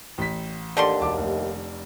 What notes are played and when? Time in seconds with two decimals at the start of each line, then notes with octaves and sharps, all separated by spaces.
0.18 A1 B6
0.77 D#2 D3 G3 C6
1.00 E1 A5 D6
1.17 F1